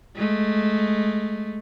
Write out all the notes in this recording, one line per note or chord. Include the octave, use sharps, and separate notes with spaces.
G#3 A3